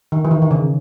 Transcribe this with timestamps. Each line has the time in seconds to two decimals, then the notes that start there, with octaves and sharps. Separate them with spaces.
0.12 D#3
0.25 E3
0.31 D#3
0.42 D#3
0.51 C#3